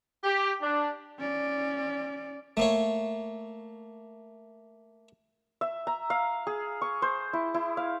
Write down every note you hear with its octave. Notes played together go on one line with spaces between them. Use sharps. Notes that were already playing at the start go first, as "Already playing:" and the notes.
G4
D4
C#4 D5
A3 A#3 C#5
E5
A#5
F5
G#4
C#6
C5
E4
E4
F5